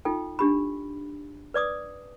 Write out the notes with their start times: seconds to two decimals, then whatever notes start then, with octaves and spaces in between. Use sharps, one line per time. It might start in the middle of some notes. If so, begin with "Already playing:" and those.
0.05 D#4 F4 A4 G5
0.39 D4 G4 B5
1.54 B4 D5 D6 D#6